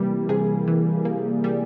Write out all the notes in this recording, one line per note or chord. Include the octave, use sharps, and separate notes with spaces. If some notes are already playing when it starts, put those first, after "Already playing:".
Already playing: C3 E3 G3 A#3
C3 G#4
E3
A#3
G3